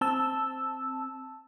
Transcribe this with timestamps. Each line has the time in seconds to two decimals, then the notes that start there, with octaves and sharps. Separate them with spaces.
0.01 C4 A5 E6